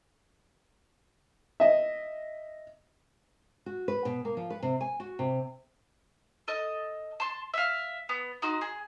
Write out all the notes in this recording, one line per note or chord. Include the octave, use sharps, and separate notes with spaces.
D#5 E5
F#4
B4
B2
A#3
F3
B4
C3
G#5
F#4
C3
A4 D#5
A5 C6
E5 F5
B3
D#4 F#4 C6
G#4